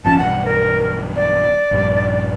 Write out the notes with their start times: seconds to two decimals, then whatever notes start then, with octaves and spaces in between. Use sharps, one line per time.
0.05 G1 F3 C#4 A5
0.18 B1 E2 G2 F#5
0.45 A#4
1.16 D5
1.71 A#1 G2